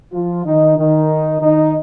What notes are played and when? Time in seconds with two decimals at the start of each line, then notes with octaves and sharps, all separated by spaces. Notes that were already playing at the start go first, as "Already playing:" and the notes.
0.13 F3 F4
0.45 D#3 D#4
0.77 D#3 D#4
1.40 D#3 D#4